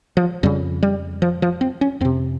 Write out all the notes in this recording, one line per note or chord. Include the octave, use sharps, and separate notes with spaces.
F3
F2 C#3 G3
G3
F3
F3
C4
C#4
F2 C3 C4